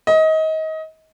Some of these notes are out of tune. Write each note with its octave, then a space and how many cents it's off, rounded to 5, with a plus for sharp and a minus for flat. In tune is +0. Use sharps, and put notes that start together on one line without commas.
D#5 +25